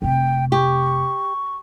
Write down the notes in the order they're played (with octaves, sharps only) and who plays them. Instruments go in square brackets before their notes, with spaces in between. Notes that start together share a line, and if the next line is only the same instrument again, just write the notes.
[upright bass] F1 C3 [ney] G5
[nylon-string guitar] G4 [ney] C#6